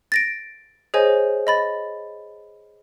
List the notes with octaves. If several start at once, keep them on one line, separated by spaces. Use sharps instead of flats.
A6 A#6 D7
G#4 C5 C#5 D#5 G#5
D#5 B5 A6